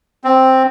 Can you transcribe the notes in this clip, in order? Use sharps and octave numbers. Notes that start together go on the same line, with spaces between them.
C4